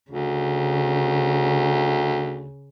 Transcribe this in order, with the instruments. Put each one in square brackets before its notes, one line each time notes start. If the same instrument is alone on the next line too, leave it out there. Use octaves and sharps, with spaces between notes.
[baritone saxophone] D2 [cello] C#3